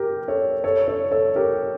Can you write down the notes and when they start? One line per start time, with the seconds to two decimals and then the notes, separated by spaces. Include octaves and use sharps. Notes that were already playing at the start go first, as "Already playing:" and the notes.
Already playing: G4 A#4
0.28 A4 C#5
0.64 A4 C#5
0.88 A4 C#5
1.11 A4 C#5
1.35 G4 A#4